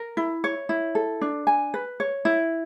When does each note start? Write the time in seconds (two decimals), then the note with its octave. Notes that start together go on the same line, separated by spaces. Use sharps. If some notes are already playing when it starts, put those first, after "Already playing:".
Already playing: A#4
0.17 E4
0.44 C#5
0.69 E4
0.95 A4
1.21 D4
1.47 G#5
1.74 B4
2.00 C#5
2.25 E4